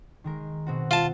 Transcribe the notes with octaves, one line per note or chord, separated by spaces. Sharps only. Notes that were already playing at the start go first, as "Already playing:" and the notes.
D#3 G#3 A#4
B2 C4 F#4
F4 A5